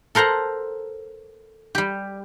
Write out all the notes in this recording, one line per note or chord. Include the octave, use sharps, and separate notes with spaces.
A4 A#4 C5 F#5 A#5
G3 G4